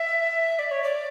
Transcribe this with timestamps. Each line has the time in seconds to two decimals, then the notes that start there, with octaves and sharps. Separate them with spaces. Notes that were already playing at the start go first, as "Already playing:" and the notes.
Already playing: E5
0.59 D5
0.71 C#5
0.84 D5